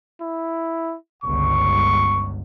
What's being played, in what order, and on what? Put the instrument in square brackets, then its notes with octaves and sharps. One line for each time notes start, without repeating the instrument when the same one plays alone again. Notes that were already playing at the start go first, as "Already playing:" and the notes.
[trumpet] E4
[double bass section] G1 C#2 [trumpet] C#6